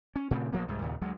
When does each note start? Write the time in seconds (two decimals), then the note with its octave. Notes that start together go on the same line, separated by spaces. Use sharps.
0.16 C#4
0.31 A#2 C#3 A3 C4
0.53 A#1 F3 A#3 B3
0.68 C2 G#2 G3
0.82 D#2 A#2 C#3
1.01 D2 F#3 G#3